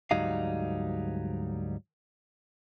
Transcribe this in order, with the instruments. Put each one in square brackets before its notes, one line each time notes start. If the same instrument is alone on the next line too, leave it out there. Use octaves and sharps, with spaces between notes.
[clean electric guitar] D2 G#2 F#3 G3 D#4 F5